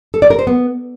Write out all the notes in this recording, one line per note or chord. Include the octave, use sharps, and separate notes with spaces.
A4
D5
A#4
C5
B3